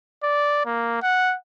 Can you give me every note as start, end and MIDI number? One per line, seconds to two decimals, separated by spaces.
0.23 0.62 74
0.66 1.00 58
1.02 1.35 78